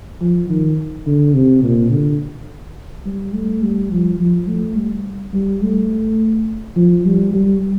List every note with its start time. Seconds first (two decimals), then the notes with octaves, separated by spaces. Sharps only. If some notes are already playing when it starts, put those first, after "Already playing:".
0.21 F3
0.49 D#3
1.06 D3
1.34 C3
1.63 A#2
1.91 D3
3.06 G3
3.33 A3
3.62 G3
3.92 F3
4.20 F3
4.48 A3
4.76 G3
5.33 G3
5.62 A3
6.76 F3
7.05 G3
7.33 G3